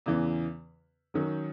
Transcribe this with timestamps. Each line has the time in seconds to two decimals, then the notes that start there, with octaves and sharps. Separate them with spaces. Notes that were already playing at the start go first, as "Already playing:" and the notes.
0.06 E2 C#3 E3
1.14 D#3 F#3 C#4